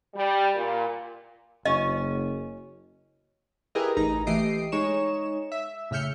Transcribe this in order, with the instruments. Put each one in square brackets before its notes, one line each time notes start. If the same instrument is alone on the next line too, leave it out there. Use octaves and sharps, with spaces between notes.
[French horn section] G3
A#2
[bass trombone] F#1 [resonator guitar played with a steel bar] C#4 [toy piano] D#5
[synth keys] E4 G4 G#4 A#4 B4 D#5
A1 D#4 A#5
E3 A3 G4 D#5 C7 D7
G#3 D#4 C#5 C#6 E7
E5
A2 C#3 E5 F6 G6 C#7